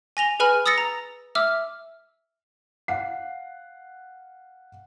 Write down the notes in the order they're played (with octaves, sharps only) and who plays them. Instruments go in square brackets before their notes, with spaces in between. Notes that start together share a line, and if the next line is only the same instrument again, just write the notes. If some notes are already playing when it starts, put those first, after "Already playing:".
[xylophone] G#5 A#6 F7 G7
G#4 B4 G#5 B5 F6
D#6 E6 A6 A#6 C#7
A#5
E5 D6 E6 F6
[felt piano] F5 F#5 C7